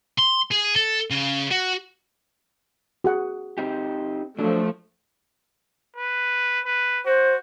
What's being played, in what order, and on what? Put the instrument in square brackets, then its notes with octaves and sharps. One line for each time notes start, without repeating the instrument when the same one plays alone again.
[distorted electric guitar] C6
G#4
A4
C#3
F#4
[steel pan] F#4 G#4 F#5
[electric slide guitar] C4 D#4 G4
[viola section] F3 A3 [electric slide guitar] F#3 D4
[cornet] B4
B4
[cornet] F#4 [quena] C5